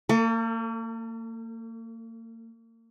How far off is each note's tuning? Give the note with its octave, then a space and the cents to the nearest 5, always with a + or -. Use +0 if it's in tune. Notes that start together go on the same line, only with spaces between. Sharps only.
A#3 -40 A4 +30